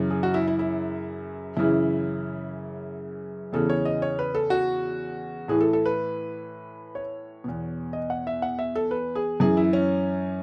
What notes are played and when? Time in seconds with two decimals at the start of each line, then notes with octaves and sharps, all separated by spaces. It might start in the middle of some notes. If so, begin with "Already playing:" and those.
Already playing: F#2 C#3 E3
0.10 G#4
0.23 F#4
0.34 E4
0.48 E4
0.59 E4
1.57 F#2 C#3 E3 E4
3.53 E2 C#3 E3 A4
3.70 C#5
3.85 D#5
4.02 C#5
4.19 B4
4.35 A4
4.50 F#4
5.48 A2 E3 G#4
5.61 A4
5.73 A4
5.86 B4
6.95 C#5
7.44 E2 B2
7.93 D#5
8.10 F#5
8.27 E5
8.42 F#5
8.59 E5
8.76 A4
8.91 B4
9.15 G#4
9.40 F#2 E3 G#4
9.57 E4
9.73 C#4